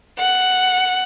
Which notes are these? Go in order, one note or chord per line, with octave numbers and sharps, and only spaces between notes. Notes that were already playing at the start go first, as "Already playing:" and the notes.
F#5